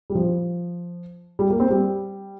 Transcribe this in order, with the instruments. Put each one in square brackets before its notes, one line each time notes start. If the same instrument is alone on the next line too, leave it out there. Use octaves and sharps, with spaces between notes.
[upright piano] G3
F3
G3
A#3
C4
G3